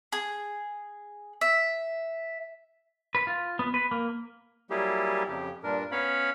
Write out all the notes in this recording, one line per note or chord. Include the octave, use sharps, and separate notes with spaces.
G#4
E5
B4
F4
B3
B4
A#3
F#3 G3 A#3 E4 G4 G#4
F2 C#3 F3 G4
G2 A#2 D4 A#4
B3 C#4 C#5 F5 B5